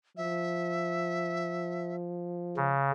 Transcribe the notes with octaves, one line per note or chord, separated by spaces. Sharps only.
F3 E5
C#3